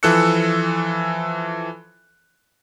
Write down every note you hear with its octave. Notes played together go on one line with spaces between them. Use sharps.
E3 F3 A4 E6 F#6 C#7